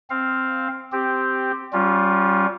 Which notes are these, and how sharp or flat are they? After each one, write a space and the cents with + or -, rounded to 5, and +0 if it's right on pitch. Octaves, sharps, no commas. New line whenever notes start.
C4 +0 F5 +0
C4 -5 G4 +0
G3 -20 C#4 -5 F4 +15